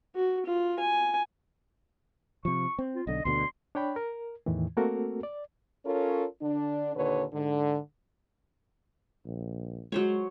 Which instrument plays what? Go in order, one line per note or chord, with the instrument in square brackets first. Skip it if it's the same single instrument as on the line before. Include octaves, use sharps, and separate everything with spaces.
[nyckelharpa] F#4
F4
G#5
[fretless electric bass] C3 F3 [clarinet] C#6
[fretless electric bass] C4
[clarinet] F4
[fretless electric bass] B1 D3 [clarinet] D#5
[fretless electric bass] D2 B2 D3 [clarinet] C6
[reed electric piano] D4 C#5 G5 B5
A#4
E2 A2 D#3 E3
A3 A#3 C4 F#4 A4 A#4
D5
[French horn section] C#4 F4 A4 A#4 C#5
D3 D4
D#2 A#2 D3 B4 C#5
G#2 D3
[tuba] A#1
[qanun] F#3 C5 C#5 [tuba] G#3